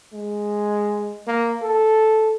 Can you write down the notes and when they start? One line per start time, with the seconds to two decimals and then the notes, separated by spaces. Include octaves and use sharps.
0.13 G#3
1.27 A#3
1.62 A4